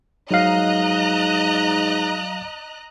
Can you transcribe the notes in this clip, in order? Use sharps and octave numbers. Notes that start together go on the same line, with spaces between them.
G#2 F#3 D#5 F5 A#5 F#6